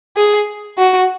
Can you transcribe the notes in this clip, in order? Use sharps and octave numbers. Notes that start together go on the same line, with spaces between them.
G#4
F#4